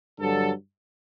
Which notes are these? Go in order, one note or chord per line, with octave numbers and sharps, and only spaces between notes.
G2 D3 F#3 A4